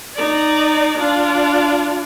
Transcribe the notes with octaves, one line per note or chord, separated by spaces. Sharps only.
D#4 D5
D4 F4